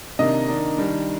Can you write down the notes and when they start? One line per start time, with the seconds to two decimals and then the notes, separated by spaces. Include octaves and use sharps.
0.19 C3 D#3 A#3 D4 D#5
0.48 D#3 A#3 D4
0.77 D#3 G3 D4